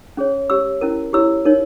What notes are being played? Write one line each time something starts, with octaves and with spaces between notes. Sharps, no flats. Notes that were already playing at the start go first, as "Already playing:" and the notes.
C#4 G#4 C#5
C#4 G4 C#5 E6
C#4 E4 A#4
E4 G4 C#5 E6
D#4 A#4 C#5